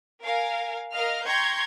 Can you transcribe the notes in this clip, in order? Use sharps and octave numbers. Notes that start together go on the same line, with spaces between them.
A#4 F5 G#5
A#4 D#5 F5 F6
G5 A#5 C6 C#6 G6 G#6